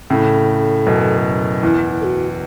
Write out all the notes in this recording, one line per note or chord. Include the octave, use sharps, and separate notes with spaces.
A2 C#3 A4
F#2 B2
E2 E4
A4
F#4